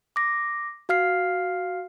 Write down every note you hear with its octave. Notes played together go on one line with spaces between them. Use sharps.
D6 A#6
F#4 F5 F6 C7